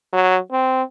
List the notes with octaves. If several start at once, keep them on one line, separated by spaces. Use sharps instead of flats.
F#3
C4